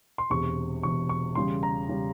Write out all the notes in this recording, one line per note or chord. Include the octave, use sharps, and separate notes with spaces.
C6
E1 E2 C3 C#6
E1 E2 C3 C#6
C#6
E2 C#3 G3 C6
A#5
C#3 G3